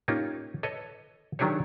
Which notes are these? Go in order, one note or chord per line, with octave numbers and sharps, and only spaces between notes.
A#3 C#4 D#4 F4 G4
A4 B4 C#5 D#5
D#3 F#3 D4 G4 G#4 C#5